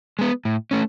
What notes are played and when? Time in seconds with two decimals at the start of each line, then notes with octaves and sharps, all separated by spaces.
0.19 G#3 B3
0.45 A2
0.71 A3 C#4